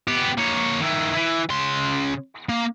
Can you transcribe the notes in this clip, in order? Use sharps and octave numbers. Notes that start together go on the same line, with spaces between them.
B3 G4
A#3 C#5
D#3 E4
E3
C#3 C6
A#3